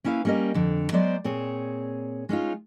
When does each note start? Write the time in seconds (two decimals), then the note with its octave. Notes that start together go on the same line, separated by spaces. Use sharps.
0.04 A#3 C#4 E4 B4 F5
0.25 G3 A#3 C#4 A#4 D#5
0.54 F2 D3
0.92 F#3 G#3 B3 C5 D5
1.24 A#2 C4 G#4 C#5
2.29 G#3 C#4 D#4 F4